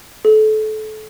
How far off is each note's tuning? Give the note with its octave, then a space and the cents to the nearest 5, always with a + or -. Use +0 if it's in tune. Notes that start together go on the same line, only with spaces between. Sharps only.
A4 -25